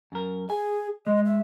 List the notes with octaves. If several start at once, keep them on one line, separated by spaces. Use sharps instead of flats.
F#2 A#4
G#4 G#5
G#3 D#5
E5